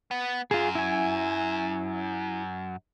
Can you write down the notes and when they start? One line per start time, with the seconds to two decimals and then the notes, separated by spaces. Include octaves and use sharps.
0.11 B3
0.51 F#2 F4 G#4
0.75 E4 G#5